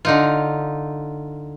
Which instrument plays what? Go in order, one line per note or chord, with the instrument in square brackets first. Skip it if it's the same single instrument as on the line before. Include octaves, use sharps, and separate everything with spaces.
[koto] D3 D#4 F4